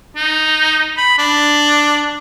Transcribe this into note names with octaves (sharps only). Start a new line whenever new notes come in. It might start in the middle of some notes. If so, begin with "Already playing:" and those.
D#4
B5
D4